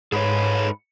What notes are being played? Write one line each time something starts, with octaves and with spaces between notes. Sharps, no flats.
G#2 G#4 A4 B4 C#5